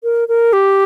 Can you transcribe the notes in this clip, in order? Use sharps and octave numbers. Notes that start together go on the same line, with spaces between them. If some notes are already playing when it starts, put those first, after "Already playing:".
A#4
A#4
G4